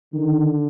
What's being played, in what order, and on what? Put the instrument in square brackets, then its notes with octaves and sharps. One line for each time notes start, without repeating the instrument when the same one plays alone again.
[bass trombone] D3 [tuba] D#3